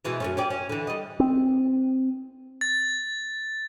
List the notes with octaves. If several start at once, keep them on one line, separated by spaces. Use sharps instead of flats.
B2 E3 G#3
F#2 A3 C#4
C#4 G4 D5
C#4
D3 E3
G3 D#5
C4
A6